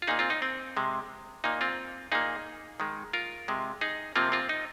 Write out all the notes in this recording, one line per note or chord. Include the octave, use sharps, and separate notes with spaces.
F4
A#2 A#3 D#4 G#4
C4 F4
D#4
C4
C3 G#3
A#2 A#3 D#4
C4 F4
A#2 A#3 D#4 G#4
D#3 G#3
F4 A#4
C3 G#3
D#4 G#4
C3 F3 A#3 C4 F4
C4 F4
D#4